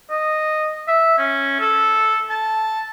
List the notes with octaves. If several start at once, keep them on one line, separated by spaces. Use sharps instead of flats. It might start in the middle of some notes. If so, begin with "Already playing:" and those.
D#5
E5
C#4
A4
A5